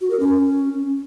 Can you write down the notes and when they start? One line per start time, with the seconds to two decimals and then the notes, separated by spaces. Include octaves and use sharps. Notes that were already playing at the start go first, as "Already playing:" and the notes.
0.01 F#4
0.10 A#4
0.20 C#4